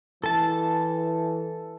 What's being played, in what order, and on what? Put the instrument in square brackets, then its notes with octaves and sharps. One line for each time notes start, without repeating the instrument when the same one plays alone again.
[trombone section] E3 [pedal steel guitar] A4 A5